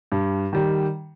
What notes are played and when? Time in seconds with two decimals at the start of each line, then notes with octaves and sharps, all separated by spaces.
0.12 G2
0.53 D#3 G3